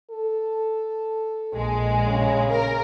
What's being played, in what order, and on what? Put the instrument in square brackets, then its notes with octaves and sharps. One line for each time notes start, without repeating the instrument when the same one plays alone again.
[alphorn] A4
[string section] A#1 G#3
[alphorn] C#3
[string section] A#4